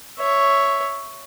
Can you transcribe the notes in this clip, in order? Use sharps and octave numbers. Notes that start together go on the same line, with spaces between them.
C#5 E5